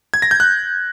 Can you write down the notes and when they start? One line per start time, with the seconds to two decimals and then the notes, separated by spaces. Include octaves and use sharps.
0.14 G#6
0.22 A#6
0.31 G6
0.40 F#6